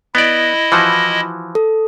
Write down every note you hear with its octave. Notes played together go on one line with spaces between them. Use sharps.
B3 E4 D5 D#5
E3 F3 F#4
A4